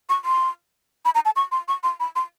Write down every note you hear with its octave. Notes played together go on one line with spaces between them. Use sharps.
C#6
C6
B5
A#5
A5
C#6
C6
C#6
C6
B5
C6